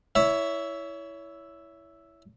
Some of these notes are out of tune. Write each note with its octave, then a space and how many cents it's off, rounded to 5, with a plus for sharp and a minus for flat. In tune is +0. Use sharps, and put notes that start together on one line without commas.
E4 +0 C#5 +25 E5 +0